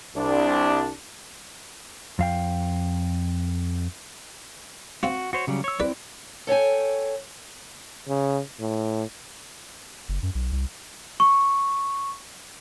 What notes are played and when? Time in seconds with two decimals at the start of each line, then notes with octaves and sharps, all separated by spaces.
0.15 C2 D4
2.19 F2 F5 G5
5.03 C4 F4 F#4
5.33 F#4 C5 C#5
5.47 C#3 F#3 G3
5.64 C#5 E6
5.80 C4 E4 B4 D5
6.47 A4 C#5 G5 G#5
8.08 C#3
8.60 A2
10.08 F#1
10.23 F#2
10.35 B1
10.52 C2
11.20 C#6